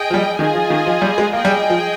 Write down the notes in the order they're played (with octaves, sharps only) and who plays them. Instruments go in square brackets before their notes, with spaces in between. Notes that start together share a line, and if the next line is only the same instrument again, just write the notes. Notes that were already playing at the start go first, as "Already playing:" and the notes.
Already playing: [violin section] G#4 D#5 G5
[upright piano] F3
G3
[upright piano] D#3 [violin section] F4 G#4 D#5 G#5
[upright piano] F3
D#3
F3
G3
G#3
[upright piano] A#3 [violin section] G#4 D#5 G5
[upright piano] G3
F3